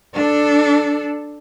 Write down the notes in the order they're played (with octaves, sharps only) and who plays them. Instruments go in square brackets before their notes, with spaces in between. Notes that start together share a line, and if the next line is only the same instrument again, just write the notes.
[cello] D4 A4